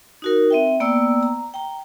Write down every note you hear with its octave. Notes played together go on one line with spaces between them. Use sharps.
D#4 F#4 A#4
C4 E5 G5
A#3 B3 D5 G5 A#5 E6
A#5
G5 A#5